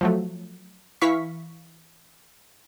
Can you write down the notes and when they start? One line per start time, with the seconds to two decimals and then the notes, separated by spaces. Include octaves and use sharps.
0.01 F3 F#3 A3
1.01 E3 E4 F5 C#6 B6